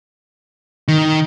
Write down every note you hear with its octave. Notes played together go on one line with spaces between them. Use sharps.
D#3